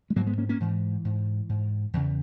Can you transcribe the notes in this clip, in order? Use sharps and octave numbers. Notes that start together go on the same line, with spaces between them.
G#3
G#2 F#3 A#3
G#3 B3
A#3 C#4
A#3 C#4
G#2 E3
G#2
G#2
E2 C#3